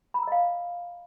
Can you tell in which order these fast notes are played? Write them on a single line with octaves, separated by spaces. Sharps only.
B5 A#5 E6 D#5 F5